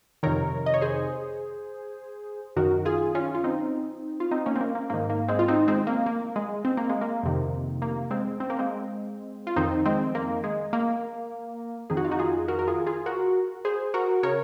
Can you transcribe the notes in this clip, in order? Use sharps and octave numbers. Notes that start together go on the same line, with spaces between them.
F2 C3 D#3 A#4 C#5
D#5
C#5
G#4 C5
F#2 D#3 F#4 A#4
F4 G#4
C#4 F4
F4
C4 D#4
F4
C4 D#4
A#3 C#4
C4
A#3
A#3
G#2 D#3 A#3
A#3
G#3 C4
F4
C4 D#4
G#3 C4
A#3
A#3
G#3
C4
A#3
G#3
A#3
F2 C3 D#3
A#3
G#3 C4
C4
A#3
G#3 C4
F4
F2 D#3 C4 D#4
G#3 C4
A#3
G#3
A#3
F2 D#3 G#4
F#4
F4
D#4 F#4
F4 G#4
F#4 A#4
A#4
F4 G#4
F4 G#4
F#4 A#4
G#4 C5
F#4 A#4
C#3 A#4 C#5